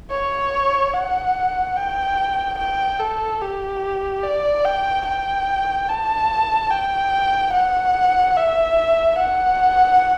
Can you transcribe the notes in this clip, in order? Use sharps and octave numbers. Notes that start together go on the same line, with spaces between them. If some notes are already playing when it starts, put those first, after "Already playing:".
C#5
F#5
G5
G5
A4
G4
D5
G5
G5
A5
G5
F#5
E5
F#5